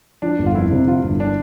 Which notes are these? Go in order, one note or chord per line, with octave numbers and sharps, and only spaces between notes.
F3 D4
G1
F4
F2 E4
C3
F3 F4
G1
D4